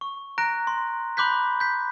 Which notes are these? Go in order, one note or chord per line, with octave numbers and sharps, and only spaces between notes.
C#6
A#5 F#6 A#6 D7
C6
B5 C6 D6 F#6 G6 B6
G6 B6